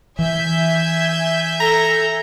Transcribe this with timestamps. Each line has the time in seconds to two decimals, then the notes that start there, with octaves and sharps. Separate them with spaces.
0.19 E3 E5 G#5 G6
1.60 A4 A#5